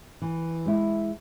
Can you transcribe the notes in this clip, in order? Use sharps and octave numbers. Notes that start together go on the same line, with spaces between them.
E3
G#3 E4